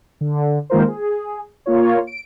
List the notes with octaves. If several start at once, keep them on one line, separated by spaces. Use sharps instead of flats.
D3
D#3 G#3 A#3 F4 A#4 C5
G#4
A#3 F4 C#5
D7